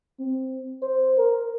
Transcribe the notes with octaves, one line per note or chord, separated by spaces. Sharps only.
C4
C5
A#4